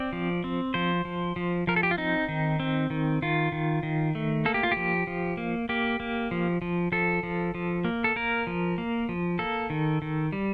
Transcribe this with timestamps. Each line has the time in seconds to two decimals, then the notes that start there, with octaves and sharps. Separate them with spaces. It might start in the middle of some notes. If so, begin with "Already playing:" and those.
Already playing: C4 D5
0.13 F3
0.44 C4
0.74 F3 C5
1.05 F3
1.36 F3
1.67 F3 A#4
1.76 A4
1.83 G4
1.91 F4
1.98 C4 D#4
2.28 D#3
2.60 C4
2.90 D#3
3.22 D#3 F4
3.52 D#3
3.83 D#3
4.15 A3
4.45 A#3 A4
4.54 G4
4.63 F4
4.72 G4
4.77 F3
5.07 F3
5.37 A#3
5.69 A#3 G4
6.00 A#3
6.31 F3
6.62 F3
6.92 F3 A4
7.23 F3
7.55 F3
7.85 A#3
8.04 A4
8.16 A#3 A#4
8.47 F3
8.78 A#3
9.09 F3
9.39 A#3 A4
9.70 D#3
10.02 D#3
10.32 G3